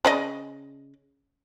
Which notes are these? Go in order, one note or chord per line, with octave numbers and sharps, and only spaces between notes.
C#3 D5 D#5